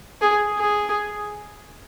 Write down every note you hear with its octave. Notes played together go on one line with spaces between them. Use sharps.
G#4
G#4